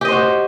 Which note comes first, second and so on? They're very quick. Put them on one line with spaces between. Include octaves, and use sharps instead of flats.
G4 D#5 C5 F#4